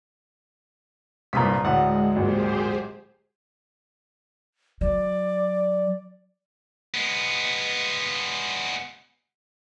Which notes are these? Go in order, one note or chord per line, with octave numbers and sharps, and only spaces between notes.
C2 G2 A#2 A#5 D#6 B6
D2 A2 G#3 F#5
G#1 A#2 F#3 G4 G#4 C5
F#3 D5
G#3 B3